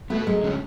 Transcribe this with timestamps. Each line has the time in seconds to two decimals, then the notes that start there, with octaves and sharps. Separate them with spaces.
0.10 A3 B3 F#4 B4
0.27 F#2 G#3
0.43 D3 F#3 C#4